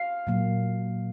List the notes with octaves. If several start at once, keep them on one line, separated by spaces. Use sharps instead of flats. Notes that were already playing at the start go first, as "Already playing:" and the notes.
Already playing: F5
A#2 F#3 A#3